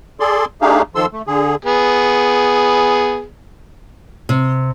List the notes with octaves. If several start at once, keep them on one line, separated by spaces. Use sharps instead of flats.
G#4 A4 D5 C6
A3 D4 D#4 G4 G#4 F5
D#3 F3 A4 C6 E6
A3
D3 G#4
B3 G#4
C3